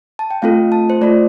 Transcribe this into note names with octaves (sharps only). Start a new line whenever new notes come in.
A5
G5
A3 C4 F4 A4 F5
A5
C5
A3 F4 A4 D5